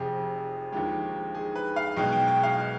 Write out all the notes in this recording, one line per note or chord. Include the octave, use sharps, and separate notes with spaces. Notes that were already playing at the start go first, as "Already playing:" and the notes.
Already playing: F1 F2 C3 G4 G#4
D#2 D3 F3 G#3 G4
G#4
B4
F5
B1 B2 G#3 G5
G5
G5
F5